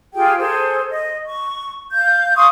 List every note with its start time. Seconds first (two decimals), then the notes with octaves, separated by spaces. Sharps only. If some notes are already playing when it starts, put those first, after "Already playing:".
0.14 F4 G4 G#4 G5
0.37 G#4 A4 C5
0.90 D#5
1.27 C#6
1.92 F5 G6
2.35 F5 C6 C#6 D#6